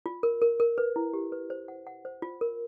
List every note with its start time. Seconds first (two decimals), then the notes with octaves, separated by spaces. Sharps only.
0.06 F4
0.23 A#4
0.42 A#4
0.60 A#4
0.78 B4
0.96 E4
1.13 G4
1.32 B4
1.50 C5
1.68 F#5
1.87 F#5
2.05 C5
2.22 F4
2.41 A#4